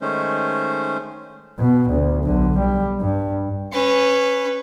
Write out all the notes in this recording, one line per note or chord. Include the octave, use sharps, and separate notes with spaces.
D#3 G#3 A3 C#4 C5
B2
D2
B1 D3
G3
G2
C#4 B4